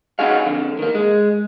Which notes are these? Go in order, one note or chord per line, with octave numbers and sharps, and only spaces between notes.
C#4 D#4 F#4 G#4 F5
F2 D3
D#3 A#3
G#3